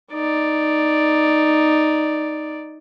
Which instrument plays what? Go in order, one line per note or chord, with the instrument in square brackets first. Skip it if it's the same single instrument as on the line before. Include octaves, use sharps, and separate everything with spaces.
[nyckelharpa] D#4 D5